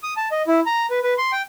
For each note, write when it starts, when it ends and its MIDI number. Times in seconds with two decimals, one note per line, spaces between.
0.03 0.14 87
0.17 0.29 81
0.31 0.42 75
0.47 0.60 64
0.66 0.86 82
0.90 0.99 71
1.03 1.14 71
1.18 1.31 84
1.32 1.42 79